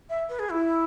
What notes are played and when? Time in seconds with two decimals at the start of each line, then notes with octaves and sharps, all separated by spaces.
0.10 E5
0.29 B4
0.39 G#4
0.51 E4